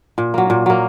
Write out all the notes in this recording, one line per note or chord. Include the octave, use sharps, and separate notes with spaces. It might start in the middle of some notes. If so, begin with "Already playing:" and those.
A#2
F#3 A#3
A#2
F#3 A#3